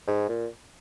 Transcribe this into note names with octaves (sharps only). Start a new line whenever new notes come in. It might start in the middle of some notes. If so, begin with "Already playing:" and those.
G#2
A#2